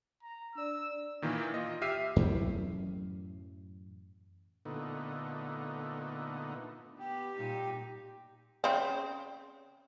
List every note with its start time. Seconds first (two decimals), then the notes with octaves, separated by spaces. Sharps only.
0.23 A#5
0.55 D4 D5 E6
1.22 A#2 D#3 E3 A#3
1.54 F4 D#5
1.82 G4 E5 F6 C7 D#7
2.16 F#2 A2 E3 F#3
4.65 A#2 D3 A3 B3 D#4
6.99 B3 G4
7.36 A#2 G3 D#4
8.64 C#3 C4